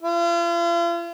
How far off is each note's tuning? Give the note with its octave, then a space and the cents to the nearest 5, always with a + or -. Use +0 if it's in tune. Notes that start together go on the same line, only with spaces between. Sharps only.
F4 -40